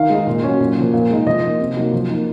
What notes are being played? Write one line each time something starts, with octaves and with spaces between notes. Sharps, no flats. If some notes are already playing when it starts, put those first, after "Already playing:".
Already playing: D#3 F5
G#3 D#4
A#2
F#3 C#4
A#2
F3 A#3
A#2
G#3 D#4
F3 D#5
A#3 D#4
C3
F#3 A#3 D#4
F3
A#3 D#4